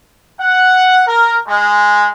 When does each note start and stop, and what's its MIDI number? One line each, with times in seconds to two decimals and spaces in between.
0.39 1.02 78
1.06 1.38 70
1.47 2.10 56